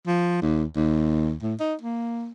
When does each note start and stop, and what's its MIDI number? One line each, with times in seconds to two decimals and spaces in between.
0.07 0.37 53
0.42 0.64 39
0.76 1.34 39
1.42 1.54 45
1.60 1.75 63
1.81 2.31 58